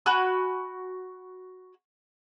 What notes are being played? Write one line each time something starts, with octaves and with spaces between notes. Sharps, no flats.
F#4 G#5 B5 F#6